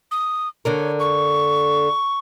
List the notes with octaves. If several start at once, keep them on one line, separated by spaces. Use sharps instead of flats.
D#6
D3 D4 A#4 C#5
C#6